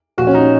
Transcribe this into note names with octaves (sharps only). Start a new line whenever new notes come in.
A#2 F3 F#4
C#4
D#4